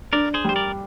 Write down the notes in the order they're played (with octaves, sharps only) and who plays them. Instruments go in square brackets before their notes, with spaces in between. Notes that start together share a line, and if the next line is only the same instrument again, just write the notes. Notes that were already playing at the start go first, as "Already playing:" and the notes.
[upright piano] D4 [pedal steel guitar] A#4 D5
[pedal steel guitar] G#4 C5
[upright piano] G3 [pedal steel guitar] C5
[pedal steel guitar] A#4 D5